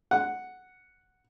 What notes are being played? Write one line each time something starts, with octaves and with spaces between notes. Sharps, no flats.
F#5